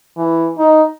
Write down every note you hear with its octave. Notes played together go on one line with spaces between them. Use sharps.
E3
D#4